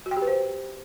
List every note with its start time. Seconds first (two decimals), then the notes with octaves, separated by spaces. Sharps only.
0.06 F#4
0.11 G5
0.17 G4
0.22 B4
0.27 C5